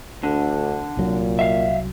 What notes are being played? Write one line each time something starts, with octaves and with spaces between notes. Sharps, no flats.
D2 D3
C2 A#2 F#3
E5 F5